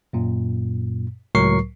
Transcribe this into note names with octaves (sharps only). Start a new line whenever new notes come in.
F#2 A#2
C#2 A2 F#3 A#4 C#6 C7